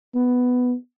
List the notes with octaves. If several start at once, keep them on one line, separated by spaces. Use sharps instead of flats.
B3